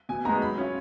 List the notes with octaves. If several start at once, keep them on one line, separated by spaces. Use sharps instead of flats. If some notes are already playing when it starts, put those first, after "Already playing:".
B2 G#5
G#3 B3 D#4 F#4 A#5
F#3 B5
C#4 F4